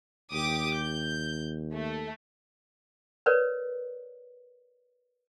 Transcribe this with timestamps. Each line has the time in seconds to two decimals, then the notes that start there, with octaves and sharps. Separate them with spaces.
0.33 D#2 G4 D6 D#6
0.78 G6
1.74 A3
3.26 A#4 B4 C#5 D5